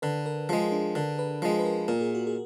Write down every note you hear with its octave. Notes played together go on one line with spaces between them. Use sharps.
D3 B4
A#4
F3 G#3 G#4
D4
D3 A#4
B4
F3 G#3
B4
A#4
A#2 A#4
G#4
F#4
G#4